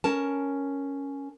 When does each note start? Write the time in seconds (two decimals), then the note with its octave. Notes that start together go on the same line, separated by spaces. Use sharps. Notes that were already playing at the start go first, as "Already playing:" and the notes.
0.04 C#4 A#4 A5